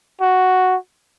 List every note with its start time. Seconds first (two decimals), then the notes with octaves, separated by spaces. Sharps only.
0.21 F#4